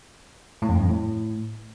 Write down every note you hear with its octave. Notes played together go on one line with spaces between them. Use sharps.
A2
F2
G2
F2
A2